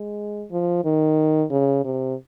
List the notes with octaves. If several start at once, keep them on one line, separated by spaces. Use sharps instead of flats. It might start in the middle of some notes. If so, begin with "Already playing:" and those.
Already playing: G#3
F3
D#3
C#3
C3